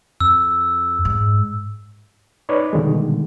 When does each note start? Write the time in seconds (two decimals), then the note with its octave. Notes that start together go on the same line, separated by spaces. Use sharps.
0.20 F2 E6
1.05 G#2
2.49 D#4 B4 C#5 D5
2.73 B2 D3 D#3 G3 G#3